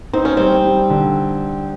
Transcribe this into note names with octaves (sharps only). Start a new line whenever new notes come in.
C4 D#4
C#4
G3 C4
G3
D3